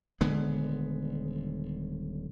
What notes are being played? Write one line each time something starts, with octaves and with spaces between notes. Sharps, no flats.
D#1 D3 G#3 B3